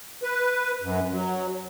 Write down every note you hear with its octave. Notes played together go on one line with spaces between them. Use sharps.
B4
F#2
F#3